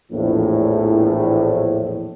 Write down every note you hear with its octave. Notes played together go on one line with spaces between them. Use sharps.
A#1 E2 A2